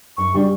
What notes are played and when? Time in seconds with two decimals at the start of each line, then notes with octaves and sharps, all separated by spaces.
0.17 F#2 C#6
0.34 C#3 G3 D4 F#4